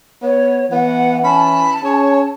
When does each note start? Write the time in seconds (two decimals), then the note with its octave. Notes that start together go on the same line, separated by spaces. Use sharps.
0.23 B3 C#5
0.72 E3 B3 F#5
1.24 C#4 A5 B5
1.84 C#4 G#4 C#5